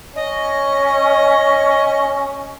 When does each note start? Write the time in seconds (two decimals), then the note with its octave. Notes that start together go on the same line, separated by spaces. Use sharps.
0.16 C#4 D#5